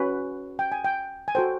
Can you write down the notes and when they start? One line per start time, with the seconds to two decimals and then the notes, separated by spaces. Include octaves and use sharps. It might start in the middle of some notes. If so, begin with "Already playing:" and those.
Already playing: C#4 F#4 B4
0.59 G5
0.72 G#5
0.84 G5
1.28 G#5
1.35 F#4 A4 C5 G5